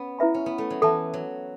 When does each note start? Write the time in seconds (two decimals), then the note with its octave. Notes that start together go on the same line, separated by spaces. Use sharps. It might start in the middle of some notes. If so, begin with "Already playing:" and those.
Already playing: B3 C#4
0.19 E4 B4 E5 B5
0.34 C#4
0.46 B3
0.58 A3
0.70 F#3
0.82 E3 A4 E5 A5
1.14 F#3